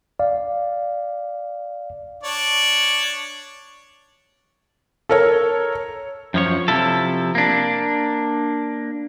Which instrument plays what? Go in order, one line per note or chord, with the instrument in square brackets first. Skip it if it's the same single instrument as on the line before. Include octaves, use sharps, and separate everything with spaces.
[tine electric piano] D5 F5
[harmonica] D4 C#5 D5
[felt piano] A4 A#4 C#5
[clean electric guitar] F#2 F3 C#5
C3 F3 E4 A4
A#3 D4